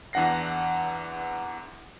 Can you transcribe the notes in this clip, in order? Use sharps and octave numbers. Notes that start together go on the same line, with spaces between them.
E2 E3 D4 F#5 A#6 C7